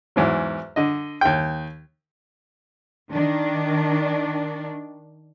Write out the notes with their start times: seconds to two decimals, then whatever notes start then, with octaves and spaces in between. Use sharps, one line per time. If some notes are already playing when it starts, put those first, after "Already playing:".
0.16 E2 G#2 F#3
0.76 D3 D#5
1.21 D#2 G5
3.12 D#3 D4